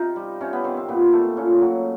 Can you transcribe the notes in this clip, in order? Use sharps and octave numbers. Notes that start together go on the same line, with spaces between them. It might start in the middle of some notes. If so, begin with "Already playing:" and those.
Already playing: C3 D#4 F4
G3
C3 C#4
B3
D#3 C4
C4
A#2 B3
A3 C4
A#2 C#4
F#3